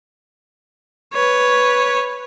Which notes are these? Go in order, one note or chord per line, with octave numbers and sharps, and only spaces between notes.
B4 C#5